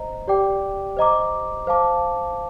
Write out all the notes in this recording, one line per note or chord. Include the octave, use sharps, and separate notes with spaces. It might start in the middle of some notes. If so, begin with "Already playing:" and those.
Already playing: C5 D#5 A#5
G4 D5 G5 D6
C5 D#5 A#5 D6
C5 F5 A5 D6